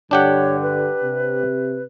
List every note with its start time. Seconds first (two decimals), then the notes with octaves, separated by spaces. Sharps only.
0.11 G2 D3 D4 G4 C#5 F#5
0.63 B4
1.03 C3